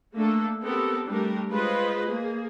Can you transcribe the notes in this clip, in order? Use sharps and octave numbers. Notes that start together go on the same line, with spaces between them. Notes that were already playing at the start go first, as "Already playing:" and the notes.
A3 A#3 D4 A4
B3 C4 G4 A4 A#4
G3 A3 D4 G4 A#4
G#3 F4 B4 C5 D#5
A#3 G#4